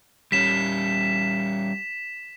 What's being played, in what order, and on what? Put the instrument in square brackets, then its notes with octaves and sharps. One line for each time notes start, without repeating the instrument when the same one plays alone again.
[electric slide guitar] G3 C#4 [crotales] B6 E7